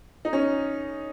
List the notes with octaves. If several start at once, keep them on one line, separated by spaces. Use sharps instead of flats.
D#4
C#4